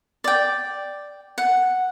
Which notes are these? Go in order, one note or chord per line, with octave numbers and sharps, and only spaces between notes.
D5 G5
F#5